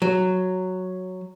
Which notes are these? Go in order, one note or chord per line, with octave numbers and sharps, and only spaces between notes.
F#3